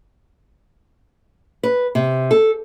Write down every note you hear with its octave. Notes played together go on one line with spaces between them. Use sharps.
B4
C3
A4